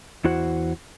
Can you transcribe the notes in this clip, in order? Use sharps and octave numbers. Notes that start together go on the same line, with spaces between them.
E2 E4 F#4 C5 F#5